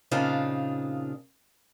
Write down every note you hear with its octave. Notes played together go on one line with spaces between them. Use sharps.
A#2 C#3 C4 D4 D#4 F4